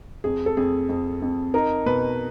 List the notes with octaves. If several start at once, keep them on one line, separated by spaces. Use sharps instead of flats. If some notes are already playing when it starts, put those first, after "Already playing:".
F2 G#4
A4
F2 G#4
F2
F2
D#4 A#4
B2 B4